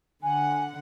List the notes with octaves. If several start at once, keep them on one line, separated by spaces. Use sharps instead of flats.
D3 F#5 G#5